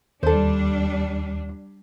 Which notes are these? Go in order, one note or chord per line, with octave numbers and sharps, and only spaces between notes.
D#2 G3 D4 A4 C5